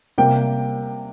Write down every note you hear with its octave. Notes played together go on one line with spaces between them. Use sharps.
C3 G3 A#3 G5